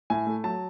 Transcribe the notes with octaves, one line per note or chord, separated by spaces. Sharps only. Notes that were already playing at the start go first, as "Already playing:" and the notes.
A2 G#5
A3
F#3 A5